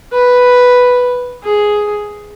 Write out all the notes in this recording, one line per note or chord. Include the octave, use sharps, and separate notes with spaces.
B4
G#4